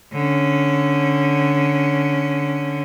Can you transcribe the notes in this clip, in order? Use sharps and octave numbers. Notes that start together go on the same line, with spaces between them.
D3 C#4